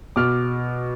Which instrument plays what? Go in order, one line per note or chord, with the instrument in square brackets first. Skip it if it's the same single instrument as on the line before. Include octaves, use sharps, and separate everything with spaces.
[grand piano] B2 D6 F6